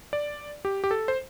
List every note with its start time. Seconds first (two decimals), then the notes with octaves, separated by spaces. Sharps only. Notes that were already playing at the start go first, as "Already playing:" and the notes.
0.13 D5
0.65 G4
0.84 G4
0.91 A4
1.08 C5